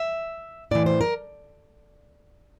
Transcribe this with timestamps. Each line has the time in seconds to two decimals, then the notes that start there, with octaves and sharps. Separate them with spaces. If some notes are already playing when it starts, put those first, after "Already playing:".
Already playing: E5
0.71 A2 E3 D5
0.86 C5
1.01 A#4